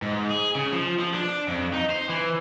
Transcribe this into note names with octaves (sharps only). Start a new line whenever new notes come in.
G#2
G#4
C#3
F3
F3
D4
F2
D#4
C5
E3